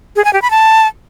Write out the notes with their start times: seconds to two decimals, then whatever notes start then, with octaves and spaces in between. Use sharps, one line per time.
0.16 G#4
0.25 G#5
0.33 G4
0.42 B5
0.51 A5